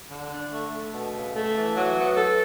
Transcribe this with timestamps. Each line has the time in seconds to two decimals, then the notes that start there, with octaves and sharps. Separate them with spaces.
0.10 D3
0.31 D4
0.52 A3
0.72 A3
0.93 B2
1.14 C#3
1.35 A3
1.54 E3
1.75 F#3
1.97 B3
2.17 A4